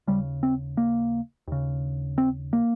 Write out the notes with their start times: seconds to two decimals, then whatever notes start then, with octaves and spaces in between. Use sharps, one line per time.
0.08 D#2 C#3 G3
0.43 C4
0.77 A#3
1.48 D#2 C#3
2.18 C4
2.53 A#3